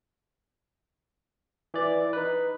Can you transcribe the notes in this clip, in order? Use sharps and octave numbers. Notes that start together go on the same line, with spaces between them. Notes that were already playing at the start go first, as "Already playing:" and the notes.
E3 D5
D#4 B4